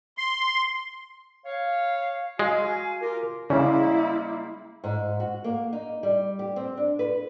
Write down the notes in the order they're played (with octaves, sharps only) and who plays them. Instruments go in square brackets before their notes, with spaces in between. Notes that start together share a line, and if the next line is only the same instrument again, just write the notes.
[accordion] C6
[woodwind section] C#5 F5
[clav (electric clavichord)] G#3 [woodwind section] F#4 F5 G#5
[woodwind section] F4 G4 A#4
[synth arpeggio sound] C#3 [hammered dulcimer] G3 G#3 A#3 [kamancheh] E4
[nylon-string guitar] G#2
F#4
A#3
D#4
G3
G4
C4
D4
B4